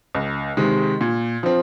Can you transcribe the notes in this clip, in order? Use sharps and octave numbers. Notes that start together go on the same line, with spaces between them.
C#2
C3 D#3 G#3
A#2
F3 C4